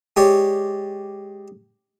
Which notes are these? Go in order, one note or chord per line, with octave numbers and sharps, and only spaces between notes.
G#3 G4 C#5 D5